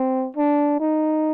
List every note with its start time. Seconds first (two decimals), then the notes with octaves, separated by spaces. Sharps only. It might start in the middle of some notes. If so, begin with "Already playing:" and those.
Already playing: C4
0.36 D4
0.80 D#4